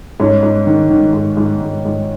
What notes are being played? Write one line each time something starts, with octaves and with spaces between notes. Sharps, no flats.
G#2 C#4
G#2
D#3
D#3
G#2
G#2
G#2
G#2